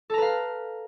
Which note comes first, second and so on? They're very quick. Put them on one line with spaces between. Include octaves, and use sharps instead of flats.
A4 A#5 B4 F5